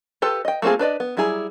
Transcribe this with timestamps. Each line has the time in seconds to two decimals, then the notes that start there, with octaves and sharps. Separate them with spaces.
0.22 F4 G4 A4 B4
0.45 D#5 G5
0.62 A3 A#3 C4 F4 G#4
0.79 D4 B4 D5 D#5
1.00 B3
1.17 F#3 G3 E4 G#4 A#5